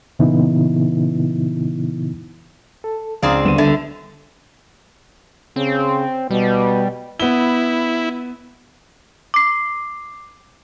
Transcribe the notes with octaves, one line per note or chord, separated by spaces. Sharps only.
A#2 C#3 E3 B3 D#4 E4
A4
C#2 C4 D4 G#4 D5 F5 A#5 D#6
D#2 D3 G3 B3 D#7 E7
C#2 D3 G3 D4 A4 E5
C#3 C4
B2 G3
B3 E4 G7
D6 C7